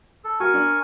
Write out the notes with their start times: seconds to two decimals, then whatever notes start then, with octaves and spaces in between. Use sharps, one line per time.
0.24 A4
0.40 F#4 A#4 G#5 C#6
0.54 D4